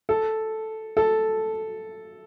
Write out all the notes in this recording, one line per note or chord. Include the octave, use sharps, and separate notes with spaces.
A4
A4